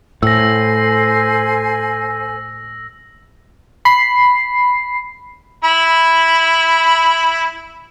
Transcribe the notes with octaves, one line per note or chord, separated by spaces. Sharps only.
A2 A4 C5 G#5 E6 A#6
B5 C7
E4 B5